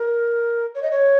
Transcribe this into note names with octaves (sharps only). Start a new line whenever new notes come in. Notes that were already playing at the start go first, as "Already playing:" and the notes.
Already playing: A#4
C#5
D#5
C#5